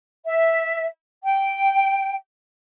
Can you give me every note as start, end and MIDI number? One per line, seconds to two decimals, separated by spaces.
0.25 0.85 76
1.23 2.15 79